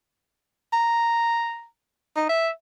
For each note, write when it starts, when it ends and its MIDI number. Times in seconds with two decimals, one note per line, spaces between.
0.73 1.65 82
2.17 2.24 63
2.29 2.50 76